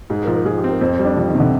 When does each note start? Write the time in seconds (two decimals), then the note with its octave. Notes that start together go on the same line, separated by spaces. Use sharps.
0.10 G#2 G#4
0.22 A#4
0.28 F3
0.34 A#4
0.46 F3 G#4
0.57 G4
0.64 C4
0.69 A#4
0.81 F2 C5
0.93 C5
0.99 G3
1.05 D4
1.16 C3 F3
1.28 D#3
1.35 C3
1.40 D3